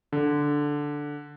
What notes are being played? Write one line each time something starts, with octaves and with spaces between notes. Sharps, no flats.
D3